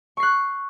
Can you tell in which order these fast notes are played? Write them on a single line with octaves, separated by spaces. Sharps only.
C#6 C7 F#6